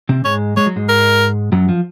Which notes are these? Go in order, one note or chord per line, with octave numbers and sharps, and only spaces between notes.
C3 C4
G#2 G#3 C#5
G#3 C#5
F#3
G#2 G#3
A#4
F#2 F#3
F3